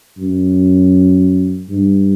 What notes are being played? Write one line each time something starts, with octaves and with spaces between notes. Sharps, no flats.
F#2
G2